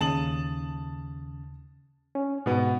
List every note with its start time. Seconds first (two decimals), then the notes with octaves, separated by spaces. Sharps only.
0.01 D#2 C#3 A5 D#6 F#7
2.15 C#4
2.46 G#2 B2 B3